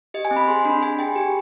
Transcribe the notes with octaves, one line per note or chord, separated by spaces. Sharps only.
G4 D#5
G#5
C4
B5
G#4 C6
D4 B5
G#4 G#5
G#4 G5
G4